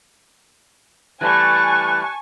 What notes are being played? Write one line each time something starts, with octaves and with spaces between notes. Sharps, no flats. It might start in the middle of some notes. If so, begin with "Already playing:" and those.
E3 G3 A3 G#5 A5 C#6 F#6